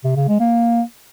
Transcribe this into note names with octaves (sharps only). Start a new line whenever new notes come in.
C3
C#3
G#3
A#3